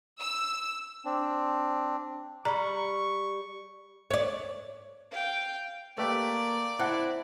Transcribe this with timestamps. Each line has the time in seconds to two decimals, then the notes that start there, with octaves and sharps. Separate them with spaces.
0.20 E6
1.05 C4 D4
2.45 G3 A#5 B5 C#6
4.11 C#5 D5
5.11 F5 G5
5.98 A3 A#3 G4 B4 D5
6.79 C4 E4 F#5 A5 F#6